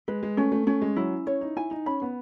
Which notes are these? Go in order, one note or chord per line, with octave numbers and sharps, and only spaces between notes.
G#3 B4
G#3
A3 C#4
A3
A3 C#4
G#3
F#3 E4
C#4 C#5
D#4
E4 G#5
D#4
C#4 B5
B3